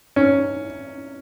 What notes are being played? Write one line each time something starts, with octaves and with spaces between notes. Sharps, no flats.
C#4